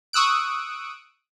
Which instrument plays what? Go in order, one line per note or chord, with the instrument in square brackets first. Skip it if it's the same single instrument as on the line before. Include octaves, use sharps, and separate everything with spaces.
[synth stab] C#6 D#6 E6 F#6 D7